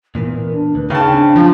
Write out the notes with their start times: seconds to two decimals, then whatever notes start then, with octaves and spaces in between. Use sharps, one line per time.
0.15 A#2 E3 B3 A#4
0.52 D4
0.75 D2 B4
0.90 C#3 D#4 F5 G5 A5
1.12 C4 D4
1.36 F3